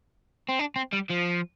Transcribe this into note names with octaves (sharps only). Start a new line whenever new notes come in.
C4
D4
C4
G3
F3